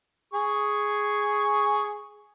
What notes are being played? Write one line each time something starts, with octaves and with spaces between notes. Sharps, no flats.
G#4 C#6